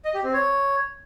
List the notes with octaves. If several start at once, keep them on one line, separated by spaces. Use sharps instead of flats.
D#5
G4
C4
C#5